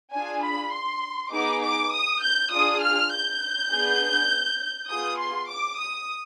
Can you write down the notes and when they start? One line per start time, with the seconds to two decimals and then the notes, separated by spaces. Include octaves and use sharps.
0.14 D4 F4 G#4 G#5
0.44 B5
0.74 C6
1.33 B3 D#4 G#4 D6
1.63 D6
1.94 D#6
2.23 G6
2.53 D4 F4 G#4 D#6
2.83 F6
3.13 G6
3.72 B3 D4 G#4
4.90 B3 F4 G#4 D#6
5.21 C6
5.51 D6
5.80 D#6